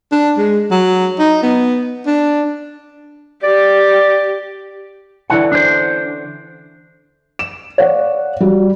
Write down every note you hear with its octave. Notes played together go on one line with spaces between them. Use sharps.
D4
G#3
F#3
D#4
B3
D4
G4 D5
D3 E3 C#4 F#5
D4 C5
E7
C#5 D5 F5 F#5
G3 F#4